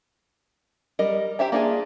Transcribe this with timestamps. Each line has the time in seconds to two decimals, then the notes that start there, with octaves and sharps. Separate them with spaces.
0.99 G3 A#4 D#5
1.39 G4 C5 E5 A#5
1.52 A#3 D4 F4 F#4 G#4